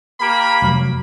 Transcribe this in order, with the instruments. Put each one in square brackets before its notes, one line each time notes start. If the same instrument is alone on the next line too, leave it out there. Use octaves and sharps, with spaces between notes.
[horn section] A#3 G4 B5
[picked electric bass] F1 F#3